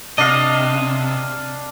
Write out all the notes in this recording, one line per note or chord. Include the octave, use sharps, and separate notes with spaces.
C3 D4 D#5 F5